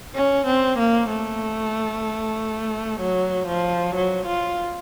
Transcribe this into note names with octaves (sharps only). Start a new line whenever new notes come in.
C#4
C4
A#3
A3
F#3
F3
F#3
F4